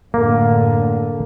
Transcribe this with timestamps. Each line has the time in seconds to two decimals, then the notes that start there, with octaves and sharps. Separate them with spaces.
0.14 F#2 A2 D3 A#3